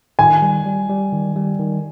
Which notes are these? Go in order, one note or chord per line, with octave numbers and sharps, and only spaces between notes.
D#3 G#5
G3
G3
G3
D#3
G3
D#3